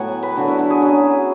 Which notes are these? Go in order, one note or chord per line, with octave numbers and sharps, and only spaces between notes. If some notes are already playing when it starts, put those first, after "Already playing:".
Already playing: A2 F#3 B3 F#5 G#5
B4
D3 F#3 B3 D4 F#4
E4
F#4
G#4
F#3 C#4 E4